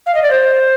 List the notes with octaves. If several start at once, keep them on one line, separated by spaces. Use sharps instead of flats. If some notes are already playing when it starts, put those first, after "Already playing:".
F5
D#5
D5
C5